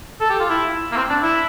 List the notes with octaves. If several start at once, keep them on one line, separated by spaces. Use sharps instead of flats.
A4
G4
F4
E4
A#3
C4
D4
E4